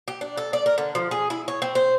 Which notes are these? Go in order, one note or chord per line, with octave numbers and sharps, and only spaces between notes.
G4
D4
A4
D5
A#4
D3
F3
G#4
E4
C#5
C4
C5